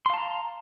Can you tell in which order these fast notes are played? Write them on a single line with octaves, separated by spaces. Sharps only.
C6 F5 A5 A#5